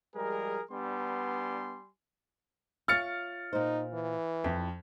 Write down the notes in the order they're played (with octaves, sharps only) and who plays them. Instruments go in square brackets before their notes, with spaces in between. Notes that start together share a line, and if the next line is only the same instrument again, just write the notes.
[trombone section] F3 G3 G#3 [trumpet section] G#4 A#4
[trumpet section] G3 G#5 C6 [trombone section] B3 D4
[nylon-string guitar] F4 C#5 E5 [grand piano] F6 A6 C#7
[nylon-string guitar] A#2 C5 [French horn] D#4
[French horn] E3
[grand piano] F2 [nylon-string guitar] E4